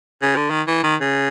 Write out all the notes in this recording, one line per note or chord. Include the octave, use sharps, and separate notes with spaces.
C#3
D3
D#3
E3
D#3
C#3